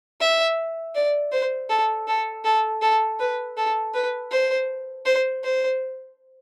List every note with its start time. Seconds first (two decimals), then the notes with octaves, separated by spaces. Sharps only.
0.21 E5
0.95 D5
1.32 C5
1.70 A4
2.08 A4
2.45 A4
2.82 A4
3.20 B4
3.57 A4
3.94 B4
4.31 C5
5.06 C5
5.44 C5